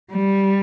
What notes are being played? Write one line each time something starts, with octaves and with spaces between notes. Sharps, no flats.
G3